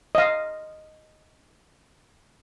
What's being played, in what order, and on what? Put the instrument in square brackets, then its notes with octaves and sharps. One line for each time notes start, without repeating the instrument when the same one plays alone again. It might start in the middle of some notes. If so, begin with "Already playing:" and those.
[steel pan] D#5 F5